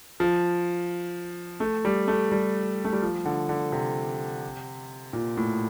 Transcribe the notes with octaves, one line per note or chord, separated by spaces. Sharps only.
F3
A3
G3
A3
G3
A3
G3
F3
D3
D3
C3
A#2
A2